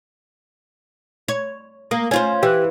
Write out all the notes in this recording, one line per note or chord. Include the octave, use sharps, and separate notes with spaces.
C#5
A#3 D#6
C#4 F4 C5 G#5
E3 G4 F#6